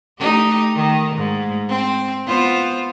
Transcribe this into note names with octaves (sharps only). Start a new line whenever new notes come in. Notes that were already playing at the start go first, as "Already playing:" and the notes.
A3 D#4 G4
D#3
G#2
C4
B3 F4 C5